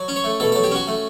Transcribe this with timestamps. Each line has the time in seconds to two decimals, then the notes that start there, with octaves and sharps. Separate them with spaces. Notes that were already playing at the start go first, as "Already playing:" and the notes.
Already playing: F#3
0.08 C#4
0.16 C#5
0.24 A3
0.40 B2 A4
0.52 F#3 A4
0.63 G4
0.71 C#4 F#4
0.88 A3